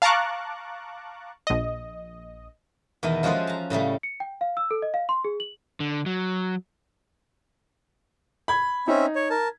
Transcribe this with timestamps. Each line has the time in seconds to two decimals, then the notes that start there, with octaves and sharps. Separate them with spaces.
0.02 F5 A5 A#5 C#6 D6 F#6
1.47 A#1 D#5
3.03 E2 B2 D#3 E4 D#5
3.23 F3 G#3 C#4 F#4 A4 C5
3.47 A5 A#5
3.70 A2 C#3 G3 A3
4.03 C#7
4.20 G5
4.41 F5
4.57 E6
4.71 A4
4.82 D#5
4.94 F5
5.09 C6
5.25 G#4
5.40 F#7
5.80 D3
6.06 F#3
8.48 B5 G#6
8.88 C4 C#4 D#4 E5
9.15 C#5
9.30 A#4 A5